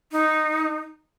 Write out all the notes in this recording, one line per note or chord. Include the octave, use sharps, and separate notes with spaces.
D#4